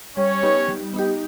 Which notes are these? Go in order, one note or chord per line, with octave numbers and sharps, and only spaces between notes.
G3 C#4 C#5
B3 D#4 G4
G3
B3 D#4 G4